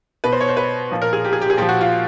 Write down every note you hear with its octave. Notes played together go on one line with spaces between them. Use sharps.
B2 B4
C5
C#5
C5
B4
A#2 F3
A#4
G#4
G4
G#4
G4
G#4
A#2 F3 G4
F#4
F4